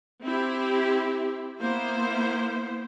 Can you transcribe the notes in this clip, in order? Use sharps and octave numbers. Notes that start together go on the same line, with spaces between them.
C4 E4 G4
A#3 B3 E4 C5